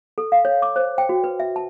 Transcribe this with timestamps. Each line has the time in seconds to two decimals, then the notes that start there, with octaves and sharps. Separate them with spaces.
0.18 A4
0.32 F5
0.45 C#5
0.62 D6
0.76 C5
0.98 G5
1.09 F#4
1.24 B4
1.40 E5
1.56 A5